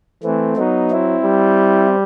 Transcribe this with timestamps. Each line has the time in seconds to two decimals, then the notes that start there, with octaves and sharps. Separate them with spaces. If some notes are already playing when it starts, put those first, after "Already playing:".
0.23 E3 A3 C4
0.57 F#3 B3 D#4
0.90 C4 E4
1.23 G3